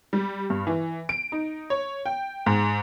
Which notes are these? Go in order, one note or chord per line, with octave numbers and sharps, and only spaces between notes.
G3
G2
E3
D7
D#4
C#5
G5
G#2